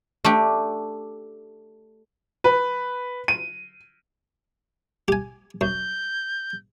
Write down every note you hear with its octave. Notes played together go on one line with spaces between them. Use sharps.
A3 D4 G4
B4
D#7
G4 G#5
F#2 G6